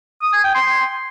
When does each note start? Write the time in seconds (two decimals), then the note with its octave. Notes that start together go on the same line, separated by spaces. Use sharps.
0.22 D#6
0.33 G#5
0.44 G5
0.55 C6